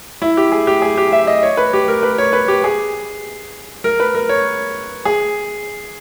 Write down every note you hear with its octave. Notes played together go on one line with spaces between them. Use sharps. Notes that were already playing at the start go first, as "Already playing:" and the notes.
E4
G4
G#4
G4
G#4
G4
E5
D#5
C#5
B4
G4
A#4
B4
C#5
B4
G4
G#4
A#4
B4
A#4
C#5
G#4